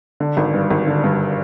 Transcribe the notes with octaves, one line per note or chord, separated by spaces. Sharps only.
D3
G#1
G2
G#1
D3
G2